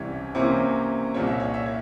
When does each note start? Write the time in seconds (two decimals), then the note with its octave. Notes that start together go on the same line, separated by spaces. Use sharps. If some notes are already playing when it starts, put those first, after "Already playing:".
Already playing: C2 C3 E3 G3 C#4 C#5
0.35 C3 E3 A#3 C#4 C5
1.14 C2 A#2 G3 C#5
1.27 E5
1.40 C#5
1.54 E5
1.66 C#5